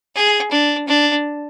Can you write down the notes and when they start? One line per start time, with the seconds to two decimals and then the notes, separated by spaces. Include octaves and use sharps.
0.15 G#4
0.51 D4
0.87 D4